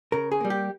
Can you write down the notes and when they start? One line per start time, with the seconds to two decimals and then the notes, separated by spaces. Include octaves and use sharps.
0.12 C#3 A#4
0.31 G#4
0.41 G3 A#3
0.50 G4